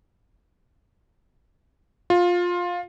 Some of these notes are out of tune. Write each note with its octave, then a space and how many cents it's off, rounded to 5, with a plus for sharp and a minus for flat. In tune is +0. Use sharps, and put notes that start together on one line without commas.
F4 +15